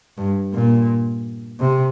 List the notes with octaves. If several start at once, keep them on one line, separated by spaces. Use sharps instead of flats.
G2
A#2
C3